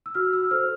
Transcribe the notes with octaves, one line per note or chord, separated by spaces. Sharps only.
E6
F#4 F6
E6
A4 C5 F6